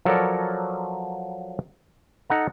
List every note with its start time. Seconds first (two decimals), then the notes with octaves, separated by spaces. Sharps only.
0.05 F3 F#3 A4 A#4 C#5 D5
2.30 D#4 A4 F#5 A#5